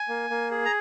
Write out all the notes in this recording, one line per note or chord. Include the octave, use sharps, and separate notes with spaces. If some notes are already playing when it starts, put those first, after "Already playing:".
Already playing: G#5
A#3
A#3
G#4
A#5